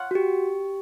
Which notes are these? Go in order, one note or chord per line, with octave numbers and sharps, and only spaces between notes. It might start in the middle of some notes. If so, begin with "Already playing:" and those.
Already playing: F4 C#5 F#5
F#4
G4